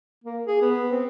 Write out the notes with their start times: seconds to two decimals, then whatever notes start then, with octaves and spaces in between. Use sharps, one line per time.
0.24 A#3
0.47 G#4
0.62 B3
0.92 C4